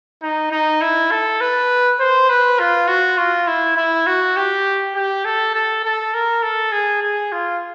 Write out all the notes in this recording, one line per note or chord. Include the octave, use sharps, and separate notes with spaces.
D#4
D#4
E4
A4
B4
C5
B4
F4
F#4
F4
E4
E4
F#4
G4
G4
A4
A4
A4
A#4
A4
G#4
G#4
F4